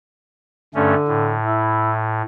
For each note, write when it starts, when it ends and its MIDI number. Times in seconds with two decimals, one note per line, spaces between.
0.75 0.95 43
0.75 1.35 50
0.75 0.95 57
0.75 0.95 61
1.08 2.22 45
1.44 1.95 64